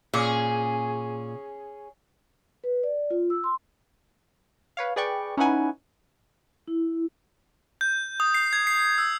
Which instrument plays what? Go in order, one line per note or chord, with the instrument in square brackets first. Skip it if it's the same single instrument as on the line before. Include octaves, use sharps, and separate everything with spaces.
[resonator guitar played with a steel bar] A#2 [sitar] C#4 G#4
[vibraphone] B4
D5
F4
E6
C6
[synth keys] B4 C#5 F5
G#4 B4 D5 G5 C#6
C#4 D#4 E4 B4 F#5 G#5
[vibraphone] E4
[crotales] G6
D#6
C7
G#6
C7
E6